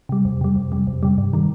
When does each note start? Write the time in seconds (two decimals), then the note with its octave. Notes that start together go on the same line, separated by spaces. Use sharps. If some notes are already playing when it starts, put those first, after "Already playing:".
0.09 C3 G3
0.25 F2
0.41 C3 G3
0.56 F2
0.72 C3 G3
0.87 F2
1.03 C3 G3
1.18 G2
1.33 D#3 G3